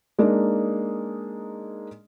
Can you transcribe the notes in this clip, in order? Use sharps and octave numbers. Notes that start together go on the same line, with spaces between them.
G#3 A#3 D4 D#4 D#5